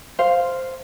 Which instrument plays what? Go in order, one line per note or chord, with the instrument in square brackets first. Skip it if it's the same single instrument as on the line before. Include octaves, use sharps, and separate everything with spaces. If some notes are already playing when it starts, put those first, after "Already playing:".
[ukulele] C5 F5